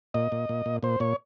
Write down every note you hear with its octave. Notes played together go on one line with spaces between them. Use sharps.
A#2 D#5
A#2
A#2
A#2
A#2 C5
A#2 C#5